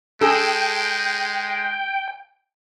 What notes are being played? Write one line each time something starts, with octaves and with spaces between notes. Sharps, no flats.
G#3 G#4 A4 G5